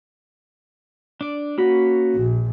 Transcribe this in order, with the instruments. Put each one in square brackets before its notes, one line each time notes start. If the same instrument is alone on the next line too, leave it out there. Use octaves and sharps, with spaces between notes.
[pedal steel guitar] D4 D5
[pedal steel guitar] A#3 C#4 B5 [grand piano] F#4
[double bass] A#1